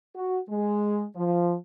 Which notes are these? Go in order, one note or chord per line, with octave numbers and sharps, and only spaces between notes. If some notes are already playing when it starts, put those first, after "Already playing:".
F#4
G#3
F3